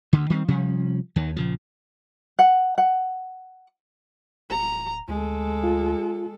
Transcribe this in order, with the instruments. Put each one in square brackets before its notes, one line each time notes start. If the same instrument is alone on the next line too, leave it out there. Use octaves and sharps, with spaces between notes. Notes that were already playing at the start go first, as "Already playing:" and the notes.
[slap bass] D2 D3
D#3 G3 A#3 C4
C3 F3 G3 C#4
D#2 D#3
A#1 C#3 F3
[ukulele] F#5
F#5
[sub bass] D1 [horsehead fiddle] A#5
[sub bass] D2 [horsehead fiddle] G#3 A4
[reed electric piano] F4